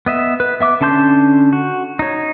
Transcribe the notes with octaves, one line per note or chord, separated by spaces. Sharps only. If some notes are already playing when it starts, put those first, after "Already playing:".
B3 D#5 E5
B4
B3 E5 D6
D3 C#4 A5 C6 G6
F#4
D#4 C#5